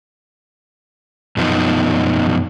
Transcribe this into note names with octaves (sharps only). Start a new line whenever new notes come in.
F#2 B2 F3 B3 D#4